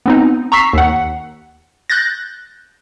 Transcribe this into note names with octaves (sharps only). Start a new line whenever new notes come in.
B3 C4 D#4
A#5 C#6 E6 B6 C7
D#2 F#5
F#6 G6 A6 A#6